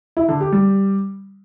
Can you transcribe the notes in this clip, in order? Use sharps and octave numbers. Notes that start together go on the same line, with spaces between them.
E4
D3
G4
G3